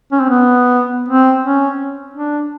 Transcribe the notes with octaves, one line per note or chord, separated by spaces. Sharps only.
C#4
C4
B3
C4
C#4
D4